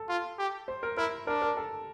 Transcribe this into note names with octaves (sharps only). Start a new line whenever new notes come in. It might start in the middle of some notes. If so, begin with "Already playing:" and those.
Already playing: A4
F4
G4
C5
A#4
E4 A#4
D4 A#4
A#4
A4